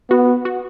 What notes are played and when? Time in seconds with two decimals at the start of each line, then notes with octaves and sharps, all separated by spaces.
0.10 B3 F#4
0.45 F#4